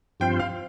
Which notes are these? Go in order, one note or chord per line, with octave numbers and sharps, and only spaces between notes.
G2 F3 C4 F4 C5 G5
F5